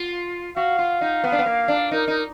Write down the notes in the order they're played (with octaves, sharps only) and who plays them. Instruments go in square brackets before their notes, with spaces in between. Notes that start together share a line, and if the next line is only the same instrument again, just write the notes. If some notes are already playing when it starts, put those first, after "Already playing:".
Already playing: [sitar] F4
[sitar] F#4 [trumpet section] F5
[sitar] F4
D#4
B3
D4
B3
A#3
D4
[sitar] D#4 [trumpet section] A#4
[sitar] D#4